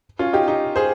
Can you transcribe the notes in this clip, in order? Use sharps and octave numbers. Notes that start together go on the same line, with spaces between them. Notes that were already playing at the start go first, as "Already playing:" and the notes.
C#4 F4
D#4 G4
D#4 G4
G#4 C5